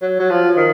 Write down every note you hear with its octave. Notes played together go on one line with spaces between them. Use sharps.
F#3
F#3
F3
D#3